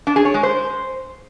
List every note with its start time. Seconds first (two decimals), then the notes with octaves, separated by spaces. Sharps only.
0.07 D4
0.16 G#4
0.25 C#5
0.34 G#3
0.43 C5